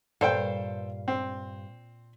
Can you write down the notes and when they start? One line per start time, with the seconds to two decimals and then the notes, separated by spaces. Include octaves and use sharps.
0.21 G2 A#2 A4 C5 F5 G5
1.08 C4